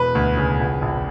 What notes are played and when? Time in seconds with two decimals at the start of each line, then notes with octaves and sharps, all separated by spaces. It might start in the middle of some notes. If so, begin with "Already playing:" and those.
Already playing: E1 B4
0.15 D2
0.37 C#3
0.59 A#1
0.82 A#1